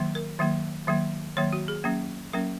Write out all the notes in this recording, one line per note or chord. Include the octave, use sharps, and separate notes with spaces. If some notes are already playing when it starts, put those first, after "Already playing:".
Already playing: D#3 F#3 A#3
A#4
D#3 F#3 A#3
D#3 F#3 A#3
D#3 F#3 A#3 C#5
F#4
G#4
F#3 A#3 C#4
F#3 A#3 C#4 A#4